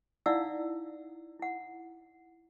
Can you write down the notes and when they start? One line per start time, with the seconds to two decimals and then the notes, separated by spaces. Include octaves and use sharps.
0.26 D#4 E4 D5 F5 F#5 E6
1.40 E4 F#5